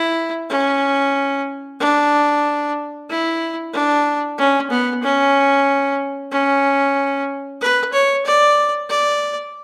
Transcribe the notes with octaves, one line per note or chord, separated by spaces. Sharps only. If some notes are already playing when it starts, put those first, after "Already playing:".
Already playing: E4
C#4
D4
E4
D4
C#4
B3
C#4
C#4
B4
C#5
D5
D5